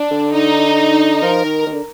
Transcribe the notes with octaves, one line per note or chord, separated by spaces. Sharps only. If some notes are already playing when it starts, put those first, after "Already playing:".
Already playing: D4
D3
D#4
F3 A#4
D#3
D#3
D3